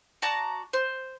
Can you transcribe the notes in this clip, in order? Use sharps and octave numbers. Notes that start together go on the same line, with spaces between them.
F#4 D5 A5 A#5
C5